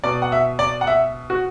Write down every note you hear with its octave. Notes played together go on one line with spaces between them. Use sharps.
B2 D5
F#5
E5
D5
F#5
E5
F#4